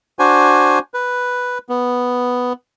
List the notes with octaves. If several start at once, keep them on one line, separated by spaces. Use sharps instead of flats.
D4 F#4 C5 G#5
B4
B3